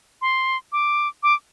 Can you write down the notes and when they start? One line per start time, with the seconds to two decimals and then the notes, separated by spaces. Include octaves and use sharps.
0.21 C6
0.72 D6
1.23 D6